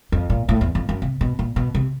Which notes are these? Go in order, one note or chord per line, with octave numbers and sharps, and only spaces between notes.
F2
A#2
A2
E2
F2
F#2
C3
B2
A#2
B2
C3